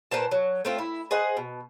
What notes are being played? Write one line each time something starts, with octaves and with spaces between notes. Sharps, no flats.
A#2 B4 C5 A5
F#3
A3 C4 F4
E4
G#4 C5 D#5 F#5
B2